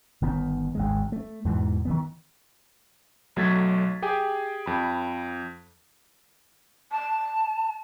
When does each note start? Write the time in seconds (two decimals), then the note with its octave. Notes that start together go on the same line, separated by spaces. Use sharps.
0.22 G1 D#3 B3
0.75 G#1 D2 G#3
1.12 A3
1.45 E2 G#2 B2 E3
1.85 D#3 E3 B3
3.36 B1 F#3 A3 G#6 A6 B6
4.02 G4 G#4 G5 G#5
4.66 F2 B5
6.92 A5